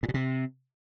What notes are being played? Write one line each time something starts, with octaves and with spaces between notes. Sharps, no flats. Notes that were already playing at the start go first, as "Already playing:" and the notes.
A2
B2
C3